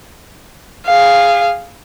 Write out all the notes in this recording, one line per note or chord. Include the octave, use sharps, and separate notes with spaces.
G#4 F5